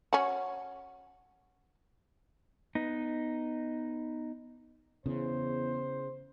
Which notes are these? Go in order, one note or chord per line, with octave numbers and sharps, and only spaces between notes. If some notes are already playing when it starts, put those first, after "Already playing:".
C#4 F#4
B3 D#4
E2 C#3 C5